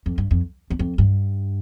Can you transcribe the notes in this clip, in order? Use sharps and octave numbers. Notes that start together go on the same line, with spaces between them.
F2
G2
F2
E2
F2
G2